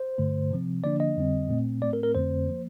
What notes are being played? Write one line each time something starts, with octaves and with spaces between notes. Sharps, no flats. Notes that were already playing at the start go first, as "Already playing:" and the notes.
Already playing: C5
G2 D3 A3
C3 F3 C4
D3 F3 A#3 D4 D5
D#5
F2 D3 G3 C4
A#2 A3 C4
A2 A3 C4 D5
A#4
A#4
F2 D3 A3 C4 C5
F3 A#3